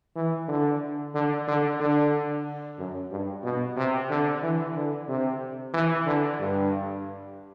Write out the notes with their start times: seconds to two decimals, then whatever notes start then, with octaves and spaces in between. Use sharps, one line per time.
0.16 E3
0.48 D3
1.15 D3
1.48 D3
1.80 D3
2.79 F#2
3.11 G2
3.43 B2
3.77 C3
4.10 D3
4.43 E3
4.75 D3
5.09 C3
5.73 E3
6.06 D3
6.40 G2